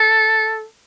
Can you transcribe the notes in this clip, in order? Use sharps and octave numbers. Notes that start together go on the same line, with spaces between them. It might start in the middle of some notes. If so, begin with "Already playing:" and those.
Already playing: A4